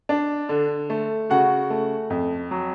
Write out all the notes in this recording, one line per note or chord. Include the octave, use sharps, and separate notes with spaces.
D4
D3
A3
C#3 F#4 F#5
A3
F2
F#3